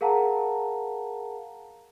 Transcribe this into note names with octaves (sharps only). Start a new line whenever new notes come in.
G#4 A#4 F5 F#5 A5 A#5